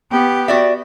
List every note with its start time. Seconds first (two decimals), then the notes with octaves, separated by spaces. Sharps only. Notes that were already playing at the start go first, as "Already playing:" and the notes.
0.11 B3 G4
0.48 F#4 D5 E5